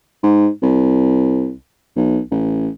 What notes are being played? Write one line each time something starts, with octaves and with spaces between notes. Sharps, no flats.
G#2
C2
B1
A1